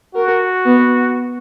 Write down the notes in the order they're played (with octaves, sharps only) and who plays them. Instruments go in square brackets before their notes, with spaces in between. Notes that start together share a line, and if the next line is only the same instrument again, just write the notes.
[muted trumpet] F#4 [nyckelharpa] A#4
[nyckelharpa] B3